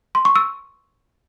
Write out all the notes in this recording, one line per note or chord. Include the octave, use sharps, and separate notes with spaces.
C6
C#6
E6